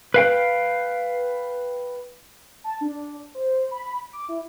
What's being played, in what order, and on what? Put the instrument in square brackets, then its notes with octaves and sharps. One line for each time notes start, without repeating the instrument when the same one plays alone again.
[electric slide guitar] B4 F5 G5
[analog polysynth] A5
D4
C5
B5
D6
E4